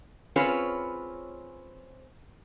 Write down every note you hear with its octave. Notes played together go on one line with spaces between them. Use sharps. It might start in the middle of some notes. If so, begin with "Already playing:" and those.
C4 C#4 F4 G#4 B4 C#5